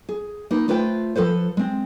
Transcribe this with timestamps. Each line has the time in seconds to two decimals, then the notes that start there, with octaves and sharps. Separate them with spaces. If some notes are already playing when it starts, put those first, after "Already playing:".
0.09 G#4
0.51 A#3 D#4 B4
0.68 A3 F4 B4 C5 G5
1.15 F3 A4 B4 C5
1.57 G#3 C4